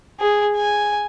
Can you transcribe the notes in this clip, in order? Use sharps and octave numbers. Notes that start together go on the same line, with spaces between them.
G#4
G#5